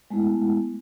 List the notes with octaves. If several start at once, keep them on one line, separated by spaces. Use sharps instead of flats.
G#3 A3 B3 E4